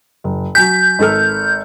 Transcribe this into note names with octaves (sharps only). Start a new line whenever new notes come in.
F#1
F#3 G#5 G6 B6
G#1 A4 F6